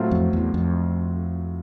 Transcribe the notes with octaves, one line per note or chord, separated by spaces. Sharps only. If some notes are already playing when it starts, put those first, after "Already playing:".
Already playing: A2 F#3 A3 C4 F4
F2
E2
F2